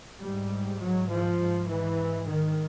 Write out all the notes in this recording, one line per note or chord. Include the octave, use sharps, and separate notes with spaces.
G#2 G3
F#3
F3
G#2
E3
D#3